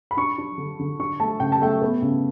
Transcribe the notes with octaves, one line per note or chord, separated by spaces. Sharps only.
B5
D4 C#6
D4
D3
D3
D4 C#6
A3 A5
C#3 G5
A5
A3 G5
B3
C#3